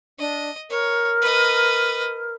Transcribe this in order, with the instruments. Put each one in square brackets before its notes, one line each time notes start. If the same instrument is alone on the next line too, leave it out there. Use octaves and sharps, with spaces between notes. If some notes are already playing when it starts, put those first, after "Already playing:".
[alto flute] D4 [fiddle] D#5
[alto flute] A#4 [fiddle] C#5
[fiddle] B4 D#5